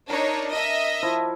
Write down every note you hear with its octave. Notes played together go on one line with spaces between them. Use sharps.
D4 D#4 A#4 C#5
D#5 E5
F3 E4